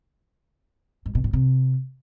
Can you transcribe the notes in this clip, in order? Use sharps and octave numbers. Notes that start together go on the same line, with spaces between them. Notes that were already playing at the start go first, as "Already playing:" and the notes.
G#2
B2
A2
C3